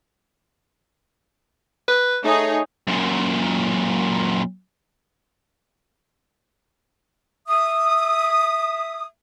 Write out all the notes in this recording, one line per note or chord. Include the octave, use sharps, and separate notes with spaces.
B4
A3 D#4 G#4 C#5
F#2 A#2
E5 D#6